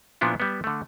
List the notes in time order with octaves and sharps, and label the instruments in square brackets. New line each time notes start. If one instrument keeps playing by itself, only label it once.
[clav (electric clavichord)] A#2 F3 B3 D4 E4
G3 B3
D3 A3